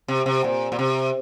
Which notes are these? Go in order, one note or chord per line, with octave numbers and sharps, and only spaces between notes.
C3
C3
A#2
A#2
C3